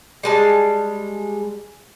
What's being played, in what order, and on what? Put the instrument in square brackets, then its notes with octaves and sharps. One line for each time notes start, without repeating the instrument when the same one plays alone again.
[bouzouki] G3 G#3 A5